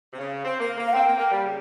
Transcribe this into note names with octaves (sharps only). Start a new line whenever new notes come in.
C3
C#3
C4
A#3
A#3
F5
C4 G5
A#3
A#3
G3
C#3